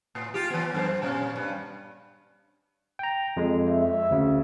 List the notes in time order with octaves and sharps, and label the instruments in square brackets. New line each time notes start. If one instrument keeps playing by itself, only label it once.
[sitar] A2
F4 G4
E3 B3
F#2 A#4 C5
A#2 G3 C#4
G2
[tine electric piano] G5 A#5
F2 G#3
[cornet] E5
[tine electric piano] D2 C#3